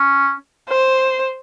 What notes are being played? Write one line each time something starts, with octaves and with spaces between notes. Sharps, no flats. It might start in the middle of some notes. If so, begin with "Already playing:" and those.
Already playing: C#4
C5